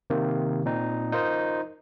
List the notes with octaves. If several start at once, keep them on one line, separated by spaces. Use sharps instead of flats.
C3 D#3 A#3
A#2 C4 D#4
D#4 F4 A#4 C5 D#5